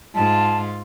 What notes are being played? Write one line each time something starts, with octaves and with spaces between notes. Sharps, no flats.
G#2 F4 A5